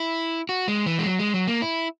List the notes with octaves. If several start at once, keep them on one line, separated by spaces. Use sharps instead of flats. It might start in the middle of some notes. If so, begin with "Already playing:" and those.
Already playing: E4
F#4
G#3
E3
G#3
F#3
G#3
F#3
A#3
E4